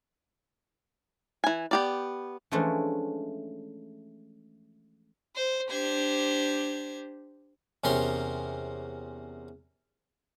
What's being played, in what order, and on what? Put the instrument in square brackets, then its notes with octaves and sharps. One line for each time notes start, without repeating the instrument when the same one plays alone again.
[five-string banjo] E3 G#5
B3 G4 D5
[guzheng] E3 F3 G#3 A3 C#4 D4
[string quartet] C5
D4 G4 C5 G#6
[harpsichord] E2 C3 C#4 A#4 C6